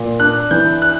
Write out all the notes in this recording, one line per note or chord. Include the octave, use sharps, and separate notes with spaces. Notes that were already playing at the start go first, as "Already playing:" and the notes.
Already playing: A#2
D4 F#6
E3 G6
F#6